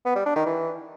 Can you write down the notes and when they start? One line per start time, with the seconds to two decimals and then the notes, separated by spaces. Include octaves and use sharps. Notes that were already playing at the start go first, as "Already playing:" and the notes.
0.05 B3
0.15 G3
0.26 D4
0.36 D#3
0.46 E3